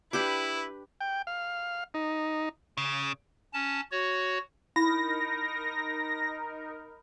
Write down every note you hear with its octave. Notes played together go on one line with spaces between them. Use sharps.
D4 E4 G4 B4 D6
G5
F5
D#4
C#3
C#4 A5
F#4 C#5
D#4 E4 A#4 B5 A#6